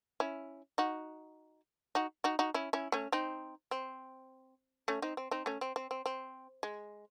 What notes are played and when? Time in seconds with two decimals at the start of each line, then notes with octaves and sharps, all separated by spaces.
0.20 C#4 E4
0.78 D#4 F#4
1.95 D#4 F#4
2.24 D#4 F#4
2.39 D#4 F#4
2.54 C#4 E4
2.73 C#4 E4
2.92 A3 C#4
3.12 C4 D#4
3.71 C4
4.88 A3 C#4
5.02 C4 D#4
5.17 C4
5.31 C4 D#4
5.46 A3 C#4
5.61 C4
5.76 C4
5.91 C4
6.06 C4
6.63 G#3